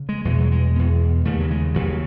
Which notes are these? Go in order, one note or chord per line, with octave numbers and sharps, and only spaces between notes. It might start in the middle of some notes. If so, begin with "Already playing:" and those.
Already playing: C#3
G#3
E2 B2 G#3
F#3
G#3
E2 B2
D#2 C#3 A3
F#3
G#3
D#2 C#3 F#3